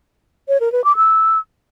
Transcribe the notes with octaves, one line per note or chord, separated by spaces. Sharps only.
C#5
A#4
B4
D6
E6